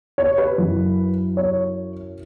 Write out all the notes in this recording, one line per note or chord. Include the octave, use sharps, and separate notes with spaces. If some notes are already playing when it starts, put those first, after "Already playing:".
C#5
B4
F#2 F#3 E4
C#5